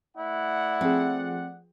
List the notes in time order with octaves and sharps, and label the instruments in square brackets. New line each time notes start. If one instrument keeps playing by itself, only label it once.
[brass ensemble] A3 D5 F#5 [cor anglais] E4
[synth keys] F3 G#4 [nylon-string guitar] C4